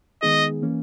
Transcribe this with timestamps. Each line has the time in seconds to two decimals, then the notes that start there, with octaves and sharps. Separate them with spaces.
0.22 D#3 G#3 B3 D#4 G#4 D#5
0.62 E3 A#3 C#4